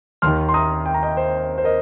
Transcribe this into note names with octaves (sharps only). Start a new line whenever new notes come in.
D#2 D#3 C6 F6
C6
A#5 D#6
G5
A#5
D#5 G5
C5
C5
A#4 D#5